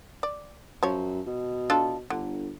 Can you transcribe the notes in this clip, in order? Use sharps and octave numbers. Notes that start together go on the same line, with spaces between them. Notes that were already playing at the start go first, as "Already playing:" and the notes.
D5
F#2 F3 C#5
B2
D4 F4 A4
G1 D3